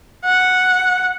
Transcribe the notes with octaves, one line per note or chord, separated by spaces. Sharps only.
F#5